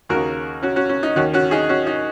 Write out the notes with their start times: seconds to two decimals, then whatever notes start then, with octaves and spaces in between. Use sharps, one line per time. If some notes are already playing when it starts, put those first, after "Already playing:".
0.09 D#2 C#3 F#4 A#4
0.63 C#4 F#4
0.76 C#4 F#4
0.89 C#4
1.03 D#4
1.16 D#2 D#3 C#4 F#4
1.33 C#4 F#4
1.51 D#4 G#4
1.69 C#4 F#4
1.87 D#4